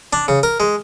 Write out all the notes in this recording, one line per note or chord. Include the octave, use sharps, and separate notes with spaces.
D4
C#3
A#4
G#3